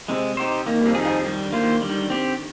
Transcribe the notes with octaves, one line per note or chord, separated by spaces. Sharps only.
C3 G#3 C4
D#4 G4 C5
D#3 A#3 D#4
G3
F2 F3
D#3 D#4 G#4
F2 F3
D#3 G3
D3
A#3 F4 C5
D#3
D3 G3
D#3
D3
C4 G4